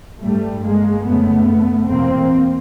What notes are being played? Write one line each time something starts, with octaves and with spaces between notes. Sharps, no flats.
G2 G3 A3
G#3 A#3
F#2 C#3 A3 B3
E2 B2 A#3 C4